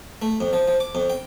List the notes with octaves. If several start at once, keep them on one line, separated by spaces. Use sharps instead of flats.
A3
F2
F3
F3
D6
F2
G5